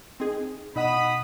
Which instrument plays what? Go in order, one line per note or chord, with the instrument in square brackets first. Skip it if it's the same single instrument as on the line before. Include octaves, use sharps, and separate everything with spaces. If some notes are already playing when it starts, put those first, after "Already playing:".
[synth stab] C4 D#4 G#4
[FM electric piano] B2 D#5 F#5 [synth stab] D#4 E7 [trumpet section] B5 D#6